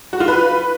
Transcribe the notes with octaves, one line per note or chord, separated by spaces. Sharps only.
F#4
F4
B4